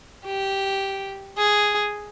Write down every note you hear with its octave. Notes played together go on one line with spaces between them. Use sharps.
G4
G#4